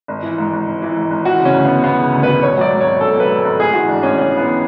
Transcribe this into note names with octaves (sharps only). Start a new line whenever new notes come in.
G#1
E3
G#2
G#1
G#1
E3
G#2
G#1
E3 F#4
C#3
C#4
D2
E1 B3
E3 B3
C#3
D2
E1 B4
G#1 C#5
F#3 D5
G#2
C#5
G#1
G#1 A4
F#3
B4
G#2
A4
G#1
A1 G#4
E3 F#4
G#2 D4
A1 C#4
A1 C#4
E3 B3